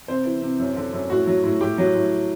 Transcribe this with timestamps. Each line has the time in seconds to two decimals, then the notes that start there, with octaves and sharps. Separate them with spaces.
0.08 C3 C5
0.25 E3
0.42 C3
0.59 F#2
0.76 D3
0.93 F#2
1.10 A2 F#4
1.27 F#3
1.44 A2
1.61 A2 G4
1.78 F#3
1.95 A2